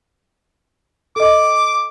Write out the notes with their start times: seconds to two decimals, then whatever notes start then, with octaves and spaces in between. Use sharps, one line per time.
1.16 A4 D#5 D6